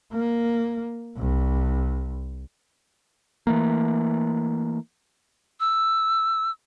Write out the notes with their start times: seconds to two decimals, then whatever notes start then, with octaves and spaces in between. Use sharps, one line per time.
0.12 A#3
1.17 C2
3.47 E3 A3 A#3
5.60 E6